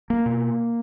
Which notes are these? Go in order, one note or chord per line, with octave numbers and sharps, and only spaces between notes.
A#3
B2